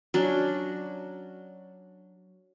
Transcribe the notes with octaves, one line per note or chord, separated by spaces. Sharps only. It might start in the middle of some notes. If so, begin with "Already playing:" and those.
F#3 C#4 D4